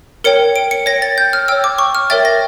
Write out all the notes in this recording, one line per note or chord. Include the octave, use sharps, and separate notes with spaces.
A#4 C#5 G5 C#7
D7
C#7
C#5 G5 A#6
A6
G6
F6
C#5 G5 E6
D6
C#6
F6
A#4 C#5 E5 G5 A6
A#6